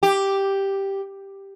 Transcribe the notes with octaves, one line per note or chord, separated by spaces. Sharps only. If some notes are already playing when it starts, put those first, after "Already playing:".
G4